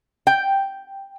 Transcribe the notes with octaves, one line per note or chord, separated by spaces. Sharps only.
G5